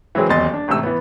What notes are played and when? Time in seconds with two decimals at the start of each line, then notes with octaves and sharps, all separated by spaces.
0.15 E3 F#3 G#3 C4 G#4
0.29 D#1 E2 F#3 D#5 C6 A6
0.53 D4
0.68 A1 G#2 C3 A3 E6
0.83 E3 B3